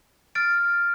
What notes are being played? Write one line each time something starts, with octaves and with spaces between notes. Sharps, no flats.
F6 A6 D7